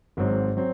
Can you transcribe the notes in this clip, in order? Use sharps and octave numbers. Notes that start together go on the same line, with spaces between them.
G#1 G#2 F#3 C4
F#3 C4